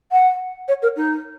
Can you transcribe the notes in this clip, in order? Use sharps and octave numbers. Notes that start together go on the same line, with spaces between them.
F#5
C#5
A#4
D#4